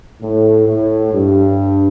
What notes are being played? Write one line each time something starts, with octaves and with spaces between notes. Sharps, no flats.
A2
A2
G2